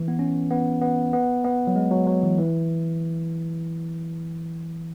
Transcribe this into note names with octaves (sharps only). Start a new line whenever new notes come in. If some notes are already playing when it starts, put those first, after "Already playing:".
Already playing: E3
B3
C#4
B3
B3
B3
B3
F#3
G#3
F#3
F#3
E3
E3